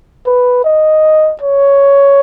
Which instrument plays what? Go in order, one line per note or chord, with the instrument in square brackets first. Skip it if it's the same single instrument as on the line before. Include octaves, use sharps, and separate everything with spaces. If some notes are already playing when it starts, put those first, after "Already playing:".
[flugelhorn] B4
D#5
C#5